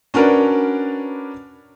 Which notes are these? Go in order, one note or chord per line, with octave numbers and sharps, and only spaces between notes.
C#4 D4 F#4 A#4 B4 D5